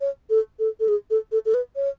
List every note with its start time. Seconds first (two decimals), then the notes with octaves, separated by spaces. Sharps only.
0.01 C#5
0.30 A4
0.59 A4
0.80 A4
0.88 G#4
1.10 A4
1.32 A4
1.46 A4
1.54 B4
1.76 C#5